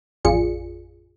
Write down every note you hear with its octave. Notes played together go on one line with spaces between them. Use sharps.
A1 F2 F4 G#4 D5 C#7